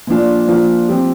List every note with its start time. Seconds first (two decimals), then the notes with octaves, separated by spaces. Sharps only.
0.07 A#2 F3 D4 F4
0.47 A#2 F3 D4 F4
0.88 F3 C4 G4